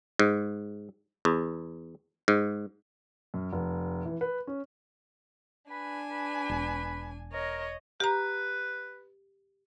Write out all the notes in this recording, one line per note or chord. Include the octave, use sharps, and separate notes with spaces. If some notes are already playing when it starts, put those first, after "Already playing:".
G#2
E2
G#2
F#2
F1
E3
B4
C#4
D4 B4 G#5
B4
E1
A#4 C#5 D#5
G4 B4 A#5